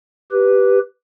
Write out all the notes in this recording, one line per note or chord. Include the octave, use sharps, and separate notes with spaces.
G4 B4